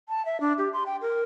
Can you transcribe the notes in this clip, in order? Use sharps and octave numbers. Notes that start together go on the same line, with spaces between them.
A5
E5
D4
G4
C6
G5
A#4